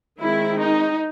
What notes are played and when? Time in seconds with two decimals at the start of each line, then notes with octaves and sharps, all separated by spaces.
0.19 D#3 G#3 C4 E4
0.59 D#4